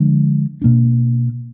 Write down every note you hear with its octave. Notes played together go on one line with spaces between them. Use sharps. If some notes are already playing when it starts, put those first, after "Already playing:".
Already playing: D3 F3 G#3 D4
B2 A#3 D4